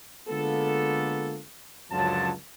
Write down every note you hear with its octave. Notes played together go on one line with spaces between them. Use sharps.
D3 G#3 A#3 B3 F4 A4
C#2 F#2 D3 F3 F#3 A5